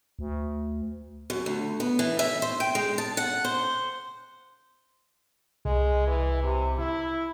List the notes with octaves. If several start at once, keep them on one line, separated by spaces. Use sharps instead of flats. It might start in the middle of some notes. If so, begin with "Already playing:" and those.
D2
F#2
D2
B3
E3
E5
C5
G5
G#3
A5
F#5
C5
C2 G#3
E3
C3
E4